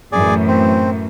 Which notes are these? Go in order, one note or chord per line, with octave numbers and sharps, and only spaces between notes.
F#2 A2 E3 G#4 D5
C4